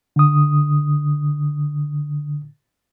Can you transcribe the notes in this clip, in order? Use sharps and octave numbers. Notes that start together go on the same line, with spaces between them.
D3 D#6